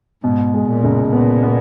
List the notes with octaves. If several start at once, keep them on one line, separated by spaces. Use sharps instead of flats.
G#2 B2
G#3
A#2
C#2
A#2 B3
B3